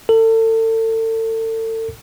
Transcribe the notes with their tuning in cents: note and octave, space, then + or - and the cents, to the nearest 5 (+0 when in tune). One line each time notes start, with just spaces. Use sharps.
A4 +35